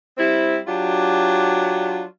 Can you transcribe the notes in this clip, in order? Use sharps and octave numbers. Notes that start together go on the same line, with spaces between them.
G3 C4 E4
F#3 D4 F4 G4